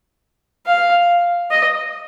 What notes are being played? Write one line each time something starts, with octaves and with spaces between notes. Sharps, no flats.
F5
D#5